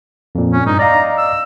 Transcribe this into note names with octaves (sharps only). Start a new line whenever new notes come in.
F2 A#2
C#4
G2 D#4
D5 D#5 F5 A#5
E6